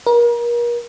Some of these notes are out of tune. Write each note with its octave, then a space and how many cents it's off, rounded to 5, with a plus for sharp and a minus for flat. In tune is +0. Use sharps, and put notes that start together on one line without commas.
A#4 +35